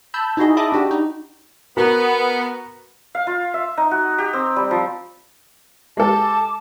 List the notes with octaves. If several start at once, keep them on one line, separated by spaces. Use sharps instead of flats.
A5 B5 E6 G6
D#4 E4 F#4 G#4 D#5
D#5 E5 A5 B5 D6 D#6
D4 F#4 G4
D#4
B3 F#4 A#4 B4
F5
F4
E5
D#4
F#4
G4
C4
G3
F3
G#3 G4 A4 A5 D6